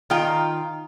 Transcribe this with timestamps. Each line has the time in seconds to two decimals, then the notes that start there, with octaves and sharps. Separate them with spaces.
0.10 D#3 F4 G5 A#5